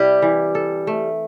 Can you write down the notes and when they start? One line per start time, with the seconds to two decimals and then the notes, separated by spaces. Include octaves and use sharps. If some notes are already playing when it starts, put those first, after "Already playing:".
Already playing: C3 G3 E4 G4
0.22 E3
0.55 A4
0.87 A3